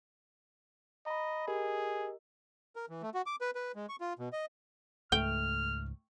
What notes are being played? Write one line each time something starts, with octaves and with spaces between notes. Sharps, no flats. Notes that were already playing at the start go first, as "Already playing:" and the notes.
D#5 A#5 B5
G4 G#4 A#4 D#5
A#4
E3
A3
F#4
D6
B4
B4
G#3
C#6
F4
B2
D#5
C#2 G#2 A3 G5 F6